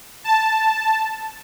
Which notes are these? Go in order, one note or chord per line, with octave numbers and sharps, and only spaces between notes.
A5